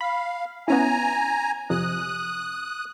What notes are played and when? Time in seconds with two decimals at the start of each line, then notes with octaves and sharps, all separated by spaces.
0.01 F5 B5
0.68 B3 C#4 E4 G#5 A#5
1.70 F2 C3 D#6 F#6